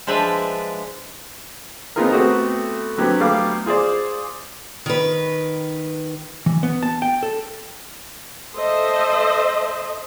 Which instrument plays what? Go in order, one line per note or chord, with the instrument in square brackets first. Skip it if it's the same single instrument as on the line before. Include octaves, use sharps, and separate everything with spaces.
[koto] F3 G#3 D4 B4 D5 E5
[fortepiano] B3 C4 D#4 F4 G#4 A#4
A3 B3 C4 F#4 G4
D3 F#3 C4 G4 B4
F#3 G3 A3 B3 F5 D6
F4 G#4 C5 D5
[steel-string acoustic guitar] D#3 B4
[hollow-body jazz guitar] E3
B3
A5
G5
A4
[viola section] A4 C5 D#5 E5